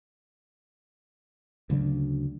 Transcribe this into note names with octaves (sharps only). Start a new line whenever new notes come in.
D2 C#3 F#3 D4